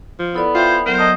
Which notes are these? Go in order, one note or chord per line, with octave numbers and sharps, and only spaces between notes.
F3
B3 E4 A4 D5
F4 C5 E5 G5 B5
G6
F#3 B3 A#4 C5
D#5 A5